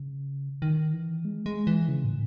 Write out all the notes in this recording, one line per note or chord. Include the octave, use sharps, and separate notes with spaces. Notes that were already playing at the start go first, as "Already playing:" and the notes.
Already playing: C#3
D#3
E3
G#3
G#3
E3
C#3
A2